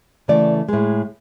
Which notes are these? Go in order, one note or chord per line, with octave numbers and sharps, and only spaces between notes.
C#3 E3 A3 D5
A2 G#3